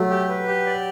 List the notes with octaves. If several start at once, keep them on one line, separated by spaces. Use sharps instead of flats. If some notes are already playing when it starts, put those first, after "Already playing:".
Already playing: F#3 A3
G4
B4
G4
D5